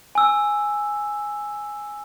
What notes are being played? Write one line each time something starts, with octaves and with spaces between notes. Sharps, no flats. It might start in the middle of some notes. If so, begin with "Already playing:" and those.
G#5 E6